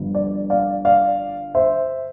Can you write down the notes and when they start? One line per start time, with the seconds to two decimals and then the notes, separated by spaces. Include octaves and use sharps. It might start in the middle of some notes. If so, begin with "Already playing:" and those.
Already playing: G1 G2 F3
0.15 D5
0.50 D5 F5
0.85 D5 F5
1.55 C5 E5